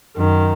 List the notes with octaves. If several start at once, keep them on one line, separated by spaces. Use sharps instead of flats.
F#2 D#3